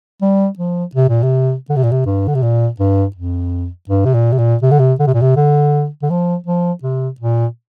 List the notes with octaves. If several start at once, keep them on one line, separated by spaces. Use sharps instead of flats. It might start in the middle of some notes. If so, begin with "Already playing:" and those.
G3
F3
C3
A#2
C3
D3
C3
A#2
C3
G2
D3
C3
A#2
G2
F2
G2
C3
A#2
C3
A#2
C3
D3
C3
D3
C3
A#2
C3
D3
D3
F3
F3
C3
A#2